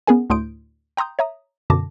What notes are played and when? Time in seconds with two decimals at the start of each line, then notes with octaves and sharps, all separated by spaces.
0.07 B3 C#4 G#4 A#4 G#5
0.30 D2 A2 C6 D#6 G6 D7
0.97 G5 A#5 C6 D#6 G6
1.19 C#5 E5 A#5 D#6
1.70 F#2 B2 D3 A5 D6 A#6